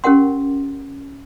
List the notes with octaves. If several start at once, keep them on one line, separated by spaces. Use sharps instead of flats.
C#4 G4 A#4 F#5 C6